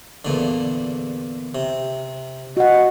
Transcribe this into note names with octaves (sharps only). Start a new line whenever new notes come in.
E2 A#2 D3
C3
F#4 D#5 F#5